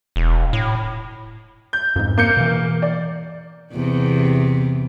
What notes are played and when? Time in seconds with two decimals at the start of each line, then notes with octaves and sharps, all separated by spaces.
0.16 E1
0.53 A2
1.73 G6
1.96 F2 G#2
2.18 A#3 G6 C#7
2.37 B2 E3
2.82 D5
3.73 E2 C3